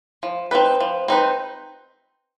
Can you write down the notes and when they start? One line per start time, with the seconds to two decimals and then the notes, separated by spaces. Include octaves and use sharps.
0.23 F3
0.51 C4 D#4 B4
0.80 F3
1.08 C4 D#4 B4